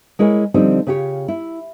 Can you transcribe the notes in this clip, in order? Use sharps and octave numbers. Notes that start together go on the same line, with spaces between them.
G#3 E4 A#4 C#5 G#5
D3 F3 G3 C4 D#4
C#3 F4 G4 B4 C#5
E4